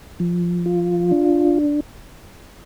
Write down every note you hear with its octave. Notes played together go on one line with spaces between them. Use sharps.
F3
F4
D4